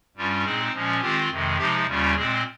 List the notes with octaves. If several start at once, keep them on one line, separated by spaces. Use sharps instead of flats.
G2 G3 C#4 F4
A#2 G#3 C4 D#4 G#4
A#2 F3 G#3 C#4
D#3 G#3 C4 F4 G4
F2 C3 D#3 G#3
C3 F3 G#3 D#4 G4
D#2 C#3 G3 C#4 F4
A#2 G#3 C4 G#4